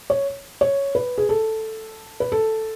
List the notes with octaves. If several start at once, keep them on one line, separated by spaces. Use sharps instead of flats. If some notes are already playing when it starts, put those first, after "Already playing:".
C#5
C#5
B4
G#4
A4
B4
A4